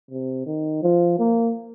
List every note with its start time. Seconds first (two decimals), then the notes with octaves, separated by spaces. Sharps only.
0.11 C3
0.46 D#3
0.83 F3
1.19 A#3